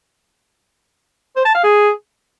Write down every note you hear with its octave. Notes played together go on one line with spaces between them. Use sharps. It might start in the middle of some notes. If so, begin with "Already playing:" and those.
C5
A5
F5
G#4